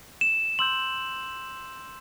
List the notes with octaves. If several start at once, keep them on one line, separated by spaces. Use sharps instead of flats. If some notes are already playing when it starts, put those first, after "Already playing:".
E7
C6 E6 G6 F#7